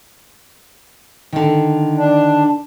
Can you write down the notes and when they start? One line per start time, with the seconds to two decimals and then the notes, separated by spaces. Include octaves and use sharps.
1.32 D3 D#3
1.96 D4